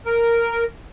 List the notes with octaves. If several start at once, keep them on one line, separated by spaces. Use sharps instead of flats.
A#4